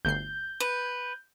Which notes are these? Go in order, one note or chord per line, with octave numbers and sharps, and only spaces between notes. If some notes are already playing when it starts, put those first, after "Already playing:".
G1 D2 G6 C7
B4